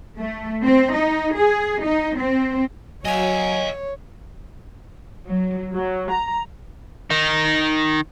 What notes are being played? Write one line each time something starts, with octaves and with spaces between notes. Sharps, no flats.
A3
C4
D#4
G#4
D#4
C4
F#3 C#5 D#5 F5 G#5
F#3
F#3
A#5
D#3 D#4